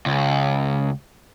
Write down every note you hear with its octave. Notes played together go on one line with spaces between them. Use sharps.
C#2